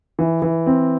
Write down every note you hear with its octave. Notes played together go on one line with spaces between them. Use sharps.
E3
E3
C4